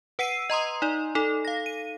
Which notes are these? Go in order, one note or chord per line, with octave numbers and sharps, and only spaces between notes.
B4 F#5 E6 C7 D#7
D#5 A#5 C6 D#6
D#4 D5
D#4 A4
F5 A#6
D#7